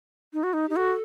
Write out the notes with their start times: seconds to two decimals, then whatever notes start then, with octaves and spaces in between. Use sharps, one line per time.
0.33 D#4
0.43 F#4
0.53 D#4
0.67 D#4 G4
0.76 F#4 A4